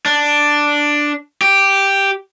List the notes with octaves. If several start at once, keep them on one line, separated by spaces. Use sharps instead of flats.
D4
G4